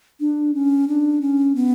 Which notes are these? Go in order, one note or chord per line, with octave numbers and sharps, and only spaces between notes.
D4
C#4
D4
C#4
B3